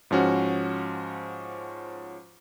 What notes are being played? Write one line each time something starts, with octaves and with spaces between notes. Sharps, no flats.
G#2 F3 C#4 F#4